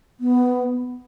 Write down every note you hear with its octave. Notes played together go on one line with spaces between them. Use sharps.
B3